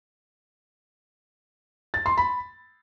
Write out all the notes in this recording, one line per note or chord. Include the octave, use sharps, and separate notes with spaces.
A6
C6
B5